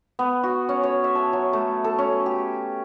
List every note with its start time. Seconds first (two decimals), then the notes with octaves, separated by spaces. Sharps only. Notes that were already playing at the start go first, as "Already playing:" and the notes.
0.19 B3
0.44 F#4
0.69 C#4
0.83 C#5
1.04 E5
1.15 A5
1.33 F#3
1.53 A3
1.84 A4
1.99 C#4
2.26 G4